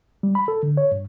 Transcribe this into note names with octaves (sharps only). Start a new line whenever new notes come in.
G3
B5
A4
D3
C#5
G2